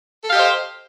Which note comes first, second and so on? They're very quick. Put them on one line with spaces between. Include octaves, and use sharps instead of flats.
A4 F5 G4 D#5 C5